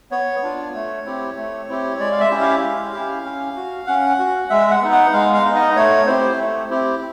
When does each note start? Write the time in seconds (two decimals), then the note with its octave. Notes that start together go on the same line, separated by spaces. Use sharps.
0.11 B3 C#5
0.43 D4 F4
0.74 A3
1.05 C4 E4 G4
1.36 A3
1.69 C4 E4 G4
1.99 G#3 D5
2.12 F5
2.20 E5
2.30 C#4 E4 G4
2.41 F5
2.62 G#3
2.93 C#4 E4 G4
3.24 C#4
3.56 F#4
3.87 C#4 F#5
4.19 F#4
4.50 G#3 E5
4.71 F#5
4.81 B3 D#4
4.92 F#5
5.13 G#3 F5
5.34 F5
5.45 B3 D#4
5.55 D#5
5.76 A3 C#5
6.06 C4 E4 G4 C5
6.38 A3
6.70 C4 E4 G4